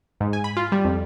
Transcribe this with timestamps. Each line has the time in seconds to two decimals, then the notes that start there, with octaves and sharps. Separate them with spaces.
0.20 G#2
0.33 G#5
0.44 B5
0.57 F4
0.72 G3
0.85 F2